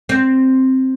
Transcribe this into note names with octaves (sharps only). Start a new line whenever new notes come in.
C4